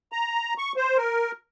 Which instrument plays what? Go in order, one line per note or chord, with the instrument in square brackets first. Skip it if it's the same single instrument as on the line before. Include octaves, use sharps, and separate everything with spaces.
[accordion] A#5
C#6
C5
A#4